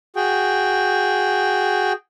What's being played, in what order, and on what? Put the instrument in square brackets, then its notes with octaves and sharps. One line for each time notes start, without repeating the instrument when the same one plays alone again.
[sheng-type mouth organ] F#4 G#4 G5